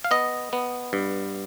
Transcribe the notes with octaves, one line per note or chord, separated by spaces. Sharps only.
F5
B3 D#5
B3
G2